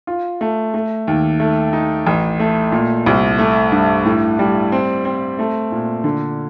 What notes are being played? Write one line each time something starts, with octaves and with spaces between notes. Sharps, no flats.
F4
A3
A3
D#2
A3
D#4
A1
A3
A#2
C2
A3
G2
A2
G3
C4
C4
A3
A#2
D3